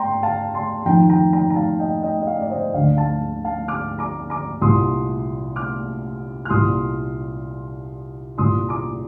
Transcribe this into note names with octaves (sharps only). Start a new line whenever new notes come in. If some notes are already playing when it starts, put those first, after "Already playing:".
Already playing: G5 A#5 C6
F5 A5
A5 C6
F2 D#3 G5 A#5
G5 A#5
G5 A#5
A#5
F5 A5
D#5 G5
D#5 G5
D#5
D5 F5
D5
C5 D#5
D2 D3 D5 F5
F5 A5
F5 A5
D6 F6
A#5 D6
A#5 D6
C2 A#2 C6 D#6
D6 F6
F6
C2 A#2 C6 D#6
C2 A#2 C6 D#6
A#5 D6